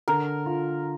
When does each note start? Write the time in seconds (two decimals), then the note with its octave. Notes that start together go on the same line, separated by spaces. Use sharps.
0.08 D3 A#4
0.46 F4